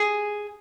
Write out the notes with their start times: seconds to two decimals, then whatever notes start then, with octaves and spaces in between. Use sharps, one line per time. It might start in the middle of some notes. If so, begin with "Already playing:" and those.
Already playing: G#4